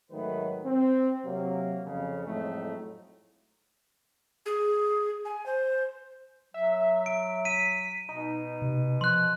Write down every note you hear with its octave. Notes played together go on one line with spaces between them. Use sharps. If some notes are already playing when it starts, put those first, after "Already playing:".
G#2 D#3 F#3 A3 B4
C4
C3 F#3 A#3
F2 C#3
F2 A2 F#3 G#3 A3 D#4
G#4
G#5
C5
F#3 E5
D7
B6 D#7
B2 D#4
C3
F3 C6 F#6